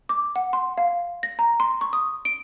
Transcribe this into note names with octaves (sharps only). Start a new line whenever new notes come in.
D6
F#5
C6
F5
A#6
A#5
C6
C#6
D#6
D7